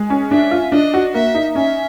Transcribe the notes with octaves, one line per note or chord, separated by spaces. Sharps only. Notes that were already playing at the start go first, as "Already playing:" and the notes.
Already playing: G#3
C#4
D4 E5
F4
D4 D#5
F#4
A#3 E5
D#4
C#4 E5